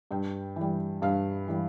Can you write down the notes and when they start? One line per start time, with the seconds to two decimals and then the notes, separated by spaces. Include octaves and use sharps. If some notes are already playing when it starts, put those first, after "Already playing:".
0.11 G2 G5
0.56 E3 G3
1.02 G2 F5
1.48 E3 G3